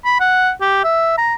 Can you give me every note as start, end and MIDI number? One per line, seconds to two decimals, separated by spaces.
0.05 0.19 83
0.20 0.51 78
0.61 0.79 67
0.84 1.17 76
1.18 1.35 82